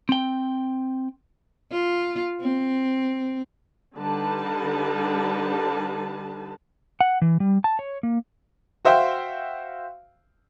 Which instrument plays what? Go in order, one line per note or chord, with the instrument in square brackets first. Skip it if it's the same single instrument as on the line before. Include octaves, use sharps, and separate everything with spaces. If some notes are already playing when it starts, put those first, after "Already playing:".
[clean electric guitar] C4 G5
[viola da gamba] F4
C4
[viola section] D3 G3 D#4 B4 A5
[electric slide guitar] F#5
E3
G3
A5
C#5
A#3
[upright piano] F#4 C5 E5 F5 G5